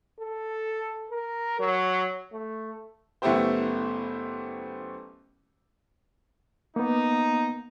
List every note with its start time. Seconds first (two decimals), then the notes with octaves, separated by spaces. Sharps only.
0.20 A4
1.11 A#4
1.60 F#3
2.33 A3
3.22 F#1 A3 B3 E4 G4 C5
6.76 A#3 B3 D#4